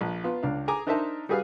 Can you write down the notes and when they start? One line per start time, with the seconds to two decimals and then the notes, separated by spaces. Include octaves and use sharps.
0.01 A#1
0.24 B3 F4
0.43 C#2 D4 F5
0.68 G#4 G#5 A#5 D6
0.87 D4 D#4 A#4 C5 E5 A5
1.29 G3 F#4 G#4 B4 F5